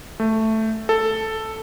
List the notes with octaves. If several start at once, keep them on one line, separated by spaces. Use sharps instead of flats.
A3
A4